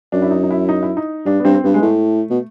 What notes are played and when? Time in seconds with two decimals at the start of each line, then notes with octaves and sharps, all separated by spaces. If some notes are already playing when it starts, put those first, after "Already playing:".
0.12 F#2 D4
0.22 E4
0.31 D#4
0.43 D#4
0.51 E4
0.69 D#4
0.83 E4
0.97 D#4
1.25 G2 D4
1.40 B3
1.44 G2 C4
1.55 C4
1.64 G2 B3
1.74 G#3
1.82 A2 A3
2.30 B2